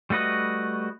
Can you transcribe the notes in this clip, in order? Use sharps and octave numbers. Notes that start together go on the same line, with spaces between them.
G3 A3 F#4 B4 D#5